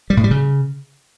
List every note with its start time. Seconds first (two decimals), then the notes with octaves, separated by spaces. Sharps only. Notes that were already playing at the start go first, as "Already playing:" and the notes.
0.10 G3
0.17 A2
0.24 G3
0.31 C#3